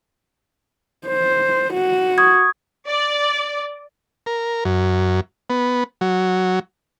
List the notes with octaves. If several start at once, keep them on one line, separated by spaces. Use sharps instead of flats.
C5
F#4
C#6 D#6 G#6
D5
A#4
F#2
B3
F#3